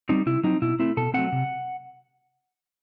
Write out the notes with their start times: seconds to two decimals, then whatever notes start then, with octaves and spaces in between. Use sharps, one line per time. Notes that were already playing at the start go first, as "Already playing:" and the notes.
0.09 G3 C4 D#4
0.26 C3 E4
0.44 F#3 C4 D#4
0.62 B2 E4
0.79 A3 C4 E4
0.97 B2 A4
1.14 F#3 A3 C4 F#5
1.32 C3